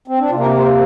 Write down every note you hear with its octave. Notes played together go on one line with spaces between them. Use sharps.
C4
D4
C3 A#3 F4 A#4
G4
C5
A#4